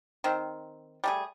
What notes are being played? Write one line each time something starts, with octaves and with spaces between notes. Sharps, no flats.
D#3 C4
G3 A3 G#4